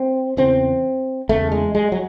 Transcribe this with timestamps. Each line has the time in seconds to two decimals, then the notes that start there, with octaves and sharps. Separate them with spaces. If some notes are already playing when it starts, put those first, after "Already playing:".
Already playing: C4
0.37 E2 C#3 C4
1.29 E2 C#3 A3
1.52 G#3
1.75 G#3
1.92 F#3